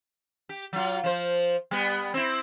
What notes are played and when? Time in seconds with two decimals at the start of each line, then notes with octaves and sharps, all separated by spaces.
0.49 G4
0.73 F#3 F4
1.03 F3 C5
1.71 G3 B3
2.14 C4 E4